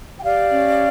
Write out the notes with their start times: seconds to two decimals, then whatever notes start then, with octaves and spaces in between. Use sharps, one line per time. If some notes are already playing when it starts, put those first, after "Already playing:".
0.19 G5
0.24 G4 D5 F5
0.51 C#4